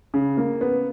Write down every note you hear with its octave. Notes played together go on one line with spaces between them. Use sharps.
C#3
A#3
B3